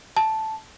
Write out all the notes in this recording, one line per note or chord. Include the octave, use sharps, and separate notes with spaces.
A5